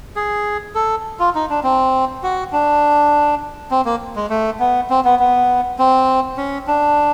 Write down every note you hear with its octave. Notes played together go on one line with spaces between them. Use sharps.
G#4
A4
F4
D#4
D4
C4
F#4
D4
C4
A#3
G#3
A3
B3
C4
B3
B3
C4
C#4
D4